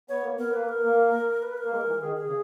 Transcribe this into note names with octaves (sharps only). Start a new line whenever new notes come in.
B3 C#5
A#3
B3 A#4
A#3 B4
A#4
A#3
B4
A#4
A#3
G#3
E3
D#3 G#4
G#4
C#3